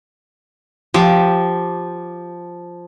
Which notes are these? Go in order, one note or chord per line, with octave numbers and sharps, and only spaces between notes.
F3 G4